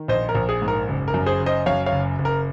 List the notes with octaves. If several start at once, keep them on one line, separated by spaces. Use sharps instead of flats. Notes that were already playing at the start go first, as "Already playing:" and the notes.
Already playing: D#3
A#1 C5 D#5
A#4
A#1
G#4
G#2
A#4
F#1
A#4
F#2
G#4 C5
F#1
C5 D#5
F#2 C#5 F5
C#5 F5
F#1
F#1
A#4